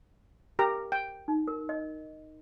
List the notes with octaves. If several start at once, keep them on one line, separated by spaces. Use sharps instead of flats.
G4 A#4 A#5
G5
D#4
A#4
D#5